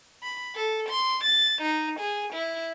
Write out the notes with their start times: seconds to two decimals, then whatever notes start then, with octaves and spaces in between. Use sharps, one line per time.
0.23 B5
0.55 A4
0.89 C6
1.24 A6
1.62 D#4
1.99 G#4
2.33 E4